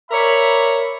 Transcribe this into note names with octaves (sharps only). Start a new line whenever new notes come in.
A#4 C#5 D5 E5 B5